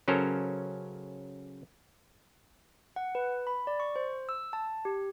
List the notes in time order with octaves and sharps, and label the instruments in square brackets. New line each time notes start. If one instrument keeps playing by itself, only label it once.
[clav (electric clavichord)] C#3 F#3 C#4 A4 A#4 C5
[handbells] F#5
B4
B5
D5
C#6
C5
E6
A5
G4